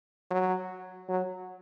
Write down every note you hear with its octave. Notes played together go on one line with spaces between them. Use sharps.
F#3
F#3